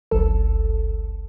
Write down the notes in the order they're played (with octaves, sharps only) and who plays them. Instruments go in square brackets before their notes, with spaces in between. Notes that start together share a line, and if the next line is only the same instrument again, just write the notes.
[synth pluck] G1 C#2 F#2 A4